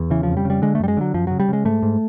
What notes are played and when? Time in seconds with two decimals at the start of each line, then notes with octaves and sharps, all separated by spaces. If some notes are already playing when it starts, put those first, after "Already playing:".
Already playing: E2
0.10 C#3 E3
0.23 F2 F3
0.37 G3
0.45 C#3
0.50 G3
0.62 D3 G#3
0.75 A3
0.80 F#2 G3
0.88 G#3
0.97 D3 F#3
1.14 F#2 F3
1.27 C#3 F#3
1.40 G3
1.49 C#3 G#3
1.65 G#2 A3
1.83 G#2